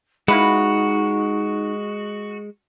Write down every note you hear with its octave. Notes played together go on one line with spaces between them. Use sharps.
G#3 A#3 D#4 E4 F#4 B4